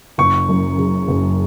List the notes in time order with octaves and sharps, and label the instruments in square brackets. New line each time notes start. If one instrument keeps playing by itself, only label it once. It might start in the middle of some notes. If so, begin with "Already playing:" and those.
[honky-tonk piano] F#1 [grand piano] C#6
[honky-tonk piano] F#2
C#3
F#1